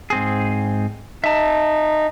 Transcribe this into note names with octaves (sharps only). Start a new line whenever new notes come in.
G#2 C4 G#4
D#4 E5 A5